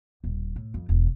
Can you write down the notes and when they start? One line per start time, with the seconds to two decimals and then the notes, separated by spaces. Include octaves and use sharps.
0.24 D#1
0.56 A2
0.74 F2
0.89 E1